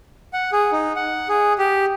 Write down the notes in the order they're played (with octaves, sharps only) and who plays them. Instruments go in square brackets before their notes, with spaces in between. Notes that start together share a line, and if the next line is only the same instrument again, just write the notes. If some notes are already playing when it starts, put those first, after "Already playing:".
[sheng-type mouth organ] F#5
G#4
D#4
F#5
G#4
G4